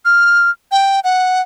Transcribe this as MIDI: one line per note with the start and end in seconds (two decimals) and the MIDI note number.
0.05 0.50 89
0.72 1.00 79
1.04 1.42 78